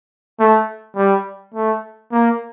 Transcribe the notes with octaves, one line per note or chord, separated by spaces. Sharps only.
A3
G3
A3
A#3